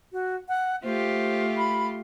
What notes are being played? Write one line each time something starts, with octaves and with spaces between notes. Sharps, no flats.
F#4
F#5
A3 F4 G4 C5
B5